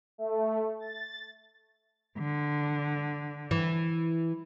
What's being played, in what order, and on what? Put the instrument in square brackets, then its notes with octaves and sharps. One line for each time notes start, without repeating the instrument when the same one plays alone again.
[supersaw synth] A3
A6
[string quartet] D3
[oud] E3